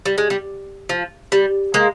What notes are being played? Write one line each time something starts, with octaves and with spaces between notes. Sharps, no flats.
G3
G#3
G3
F3
G3
G#3 A#3